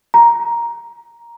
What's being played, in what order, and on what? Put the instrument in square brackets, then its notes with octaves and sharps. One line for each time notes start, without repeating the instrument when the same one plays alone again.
[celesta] A#5